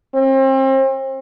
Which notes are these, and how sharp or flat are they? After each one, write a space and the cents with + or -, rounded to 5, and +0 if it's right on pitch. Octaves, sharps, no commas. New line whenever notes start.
C4 +35